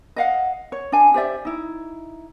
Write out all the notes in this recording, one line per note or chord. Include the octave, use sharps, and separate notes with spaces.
D#5 F5 F#5
C#5
D4 G#5
G4 C5 D5 E5
D#4 E4